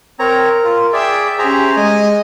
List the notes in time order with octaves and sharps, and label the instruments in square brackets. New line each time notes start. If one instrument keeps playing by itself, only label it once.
[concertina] C4 C#5 A#5 [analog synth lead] A#4
[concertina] F4
[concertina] G#4 D5 [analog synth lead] E5 [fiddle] G5
[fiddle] C#4 G4 [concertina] G#4 C5 A#5
[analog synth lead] G#3 [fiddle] D#5 [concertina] G#5